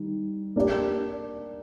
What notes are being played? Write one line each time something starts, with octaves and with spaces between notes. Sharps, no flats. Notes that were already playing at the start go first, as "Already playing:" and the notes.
Already playing: D#3 G3
A#3 D4 G4 D5